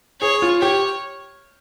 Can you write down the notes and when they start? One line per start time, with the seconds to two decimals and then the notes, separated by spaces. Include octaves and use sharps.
0.22 G#4 C#5
0.42 F4
0.62 G4 C#5